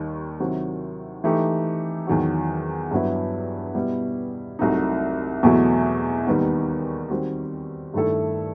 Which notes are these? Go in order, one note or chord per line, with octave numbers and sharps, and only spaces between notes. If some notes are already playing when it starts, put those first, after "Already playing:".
Already playing: D#2 D#3 G3 D#4
C3 D#3 F#3 C4 E4
E3 A3 D#4 G4
E2 D#3 F#3
G2 F#3 B3 E4
B2 G3 B3 E4
C2 C3 F#3 A3 D#4
E2 B2 F#3 A3 E4
D#2 D#3 G3 B3 D#4
D#3 G3 C4 F#4
G2 D#3 A3 E4 A4